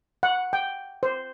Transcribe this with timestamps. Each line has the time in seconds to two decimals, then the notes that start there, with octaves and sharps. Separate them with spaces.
0.23 F#5
0.53 G5
1.03 C5